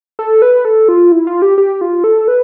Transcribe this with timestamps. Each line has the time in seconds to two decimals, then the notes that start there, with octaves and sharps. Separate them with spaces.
0.19 A4
0.42 B4
0.65 A4
0.89 F4
1.12 E4
1.27 F4
1.42 G4
1.58 G4
1.81 F4
2.04 A4
2.28 B4